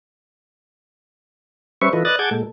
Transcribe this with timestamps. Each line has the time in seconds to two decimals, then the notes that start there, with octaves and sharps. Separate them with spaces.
1.81 G3 C#4 B4 C5 E5 C#6
1.93 E3 F4 A4 B4 D#5
2.05 B4 D5 D#5 D#6 F#6 A6
2.19 G#4 F#5 A5 D6 G6 G#6
2.31 A#2 G#3 A4